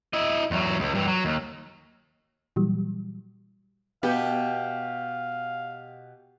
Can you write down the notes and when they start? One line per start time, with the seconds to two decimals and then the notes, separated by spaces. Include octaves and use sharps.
0.13 E4 D#5
0.51 E2 F#3
0.80 C#2
0.95 G2 E3
1.07 F#3
1.25 D#2
2.56 A#2 E3 F#3 G3
4.03 B2 B3 G4 F5